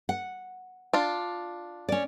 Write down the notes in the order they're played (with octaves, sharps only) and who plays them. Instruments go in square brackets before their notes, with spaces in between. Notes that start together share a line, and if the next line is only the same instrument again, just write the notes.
[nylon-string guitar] F#5
[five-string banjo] D4 F4
[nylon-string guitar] C#4 D5